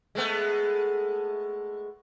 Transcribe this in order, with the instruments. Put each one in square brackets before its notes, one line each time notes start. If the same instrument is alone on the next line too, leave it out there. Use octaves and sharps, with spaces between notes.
[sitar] G#3 A3 B3